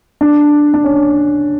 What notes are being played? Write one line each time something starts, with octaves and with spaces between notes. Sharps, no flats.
D4
D4
C#4